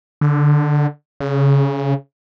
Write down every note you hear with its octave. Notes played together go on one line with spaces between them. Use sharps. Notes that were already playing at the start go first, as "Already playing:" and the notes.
D3
C#3